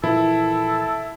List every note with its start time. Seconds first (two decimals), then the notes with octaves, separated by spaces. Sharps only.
0.04 A#2 E3 F3 E4 A4